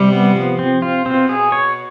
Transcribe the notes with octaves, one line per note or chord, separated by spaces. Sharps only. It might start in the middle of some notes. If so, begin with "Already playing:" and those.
Already playing: C3 G3
B3
F3
C4
F4
B2 C4
G#4
C#5